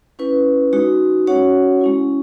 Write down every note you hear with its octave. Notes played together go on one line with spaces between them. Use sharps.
C#4 E4 B4
G#3 D#4 F#4
C#4 F#4 C#5 F#5
G#3 C#4 E4